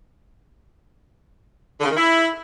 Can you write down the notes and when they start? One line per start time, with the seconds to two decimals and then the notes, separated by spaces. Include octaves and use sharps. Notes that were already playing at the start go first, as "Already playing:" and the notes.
1.80 D3
1.85 C#3
1.91 D#3
1.96 E4